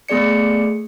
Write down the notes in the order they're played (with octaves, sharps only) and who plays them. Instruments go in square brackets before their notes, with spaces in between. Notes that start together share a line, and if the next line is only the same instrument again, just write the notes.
[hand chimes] A3 B3 G#4 D5 C#7